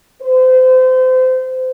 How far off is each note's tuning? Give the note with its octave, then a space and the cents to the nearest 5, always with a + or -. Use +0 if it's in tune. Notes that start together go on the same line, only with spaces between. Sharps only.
C5 -30